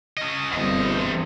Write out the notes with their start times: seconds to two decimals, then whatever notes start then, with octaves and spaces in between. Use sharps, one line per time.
0.18 C#4 D#5
0.52 G1 E2 G2 C4 D#5